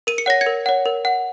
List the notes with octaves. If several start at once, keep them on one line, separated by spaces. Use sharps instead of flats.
A#4 D#7
C#7
C#5 F#5 A#6
G#6 C#7
A#4
C#5 F#5
A#4
F#5